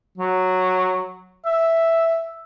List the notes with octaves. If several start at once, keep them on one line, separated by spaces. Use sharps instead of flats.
F#3
E5